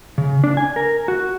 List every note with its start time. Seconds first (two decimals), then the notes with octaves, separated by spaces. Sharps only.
0.18 C#3
0.44 D4
0.57 G#5
0.76 A#4
1.08 F#4